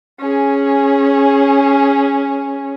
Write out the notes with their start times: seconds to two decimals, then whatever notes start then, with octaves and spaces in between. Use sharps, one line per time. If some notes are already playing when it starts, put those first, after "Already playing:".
0.20 C#4 G#4